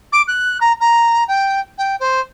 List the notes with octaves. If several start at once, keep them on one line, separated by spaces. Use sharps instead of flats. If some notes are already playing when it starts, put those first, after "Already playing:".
D6
F#6
A#5
A#5
G5
G5
C5